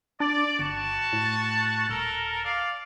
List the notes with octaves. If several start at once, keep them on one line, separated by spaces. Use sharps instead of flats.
D4 D5
G1 F#4 A5
A2
D#1 A4 A#4
D5 F5